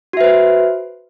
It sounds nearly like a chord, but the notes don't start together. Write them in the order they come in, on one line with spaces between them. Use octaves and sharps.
F#4 E5 B4 C5